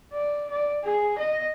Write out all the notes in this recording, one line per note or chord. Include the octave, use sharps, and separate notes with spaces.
D5
D5
G#4
D#5